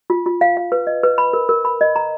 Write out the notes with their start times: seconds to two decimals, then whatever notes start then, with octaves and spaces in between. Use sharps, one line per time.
0.10 F4
0.26 F4
0.41 F5
0.57 F5
0.72 B4
0.87 D#5
1.03 B4
1.18 B5
1.33 A#4
1.49 A#4
1.65 B5
1.81 D#5
1.96 A#5